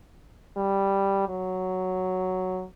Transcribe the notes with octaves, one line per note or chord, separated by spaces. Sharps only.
G3
F#3